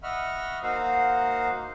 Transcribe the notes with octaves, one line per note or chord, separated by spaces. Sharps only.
D#5 E5 F#5 B5 C#6 F6
A#3 D#4 F#4 C5 F5 F#5